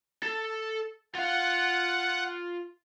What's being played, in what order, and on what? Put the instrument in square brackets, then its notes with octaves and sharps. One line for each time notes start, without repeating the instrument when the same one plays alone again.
[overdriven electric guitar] A4
[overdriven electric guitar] F4 F5 [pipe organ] F#5